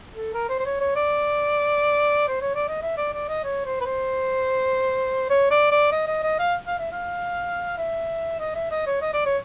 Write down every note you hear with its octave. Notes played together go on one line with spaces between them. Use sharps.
A4
A#4
C5
C5
C#5
C#5
D5
C5
C#5
D5
D#5
E5
D5
D5
D#5
C#5
C5
B4
C5
C#5
D5
D5
D#5
D#5
D#5
F5
F5
E5
F5
E5
D#5
E5
D#5
C#5
D#5
D5
C#5